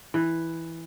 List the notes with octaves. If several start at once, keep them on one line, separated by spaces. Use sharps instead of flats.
E3